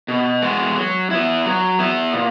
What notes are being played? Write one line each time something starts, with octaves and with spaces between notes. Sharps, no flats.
B2
G#3 B3 F#4
F#3
B3 E4
F#3
B3 E4
A#2